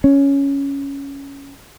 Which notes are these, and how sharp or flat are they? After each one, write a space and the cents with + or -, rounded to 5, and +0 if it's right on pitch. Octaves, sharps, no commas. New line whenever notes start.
C#4 +5